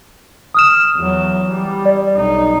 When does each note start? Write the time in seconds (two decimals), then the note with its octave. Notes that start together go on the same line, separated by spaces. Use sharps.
0.54 D#6 F6 E7
0.96 E2 F#3
1.52 G3
1.86 D5
2.17 B1 D#4